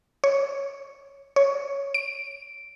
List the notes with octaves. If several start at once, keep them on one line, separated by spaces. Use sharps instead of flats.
C#5
C#5
D7